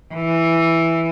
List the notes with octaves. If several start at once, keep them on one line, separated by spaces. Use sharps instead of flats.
E3